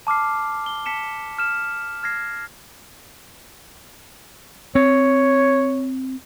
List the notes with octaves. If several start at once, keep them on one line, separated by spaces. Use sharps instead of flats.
A5 D6 F6 C7
G7
A5 B6 C#7 E7
F6 E7
F6 G#6 A#6 C7
C4 C#5